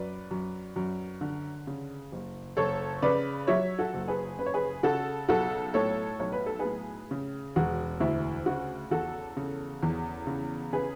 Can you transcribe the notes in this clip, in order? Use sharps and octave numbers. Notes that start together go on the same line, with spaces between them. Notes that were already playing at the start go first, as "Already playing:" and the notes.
Already playing: F#2 B4 D5
F#2
F#2
D3
C#3
F#1
F#1 A4 C#5
C#3 B4 D5
F#3 C#5 E5
F#4 A4
F#1
G#4 B4
C#3 B4
C#5
G#4 B4
C#3 F#4 A4
B1 F#4 A4
A2 A4 C#5
B1 C#5
B4
A4
G#4 B4
A2
C#3
E1 F#4
D2 E4
C#3 F#4
E2 F#4 A4
C#3
E2
C#3
C#3 G#4 B4